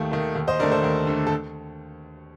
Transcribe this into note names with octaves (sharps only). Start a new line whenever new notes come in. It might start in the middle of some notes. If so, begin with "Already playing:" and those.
Already playing: D#2 D#3 A3 F5
D#3 A3
D#2
C5 D#5
D3 A3 A#4 D5
A4 C5
D#2 A#4
D3 A3
A4